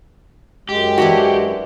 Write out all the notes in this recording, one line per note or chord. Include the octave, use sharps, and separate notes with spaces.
F#2 G#3 G4
E3 D4 F#4 B5